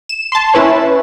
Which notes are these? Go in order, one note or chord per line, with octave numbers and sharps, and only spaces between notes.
E7
A5 C6
C#4 E4 B4 C#5